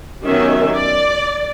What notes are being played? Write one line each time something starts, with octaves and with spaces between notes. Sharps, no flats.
D#3 F#3 B3 C#4 G4 E5
D5